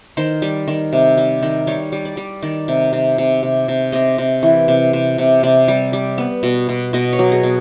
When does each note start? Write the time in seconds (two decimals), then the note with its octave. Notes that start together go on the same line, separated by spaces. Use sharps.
0.17 D#3 C5
0.42 G3
0.68 D#3
0.93 C3
1.17 G3
1.43 D#3
1.67 G3 C#5
1.92 G3
2.05 D5
2.17 G3
2.42 D#3 D5
2.68 C3
2.93 C3
3.18 C3
3.43 C3
3.68 C3
3.92 C3 D#5
4.18 C3
4.43 E3
4.68 C3
4.93 C3
5.18 C3
5.43 C3 D5
5.68 G3
5.93 G3
6.18 B3
6.43 B2
6.69 B2
6.93 B2 D#5
7.13 C#5
7.19 F#3
7.32 G#4
7.43 B2